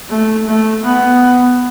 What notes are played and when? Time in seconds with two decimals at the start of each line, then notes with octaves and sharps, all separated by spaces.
0.10 A3
0.47 A3
0.83 B3